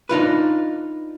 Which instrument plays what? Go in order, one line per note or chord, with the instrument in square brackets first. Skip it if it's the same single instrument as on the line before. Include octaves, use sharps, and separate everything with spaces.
[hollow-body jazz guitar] D4 D#4 F4 B4